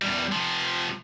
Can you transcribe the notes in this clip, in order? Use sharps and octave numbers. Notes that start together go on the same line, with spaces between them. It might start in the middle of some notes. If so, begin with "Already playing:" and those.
E2 G3
C3 F3